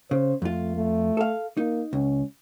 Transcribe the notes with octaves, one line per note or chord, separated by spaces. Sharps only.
C#3 C5
F2 A3 F4
A3
A4 F5
A#3 D#4
C#2 C#4